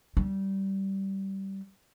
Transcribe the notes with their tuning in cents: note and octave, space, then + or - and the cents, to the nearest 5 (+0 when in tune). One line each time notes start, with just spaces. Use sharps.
G3 -15